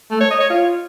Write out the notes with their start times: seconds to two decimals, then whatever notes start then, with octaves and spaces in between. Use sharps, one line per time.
0.11 A3
0.21 C#5
0.30 D#5
0.40 C#5
0.50 F4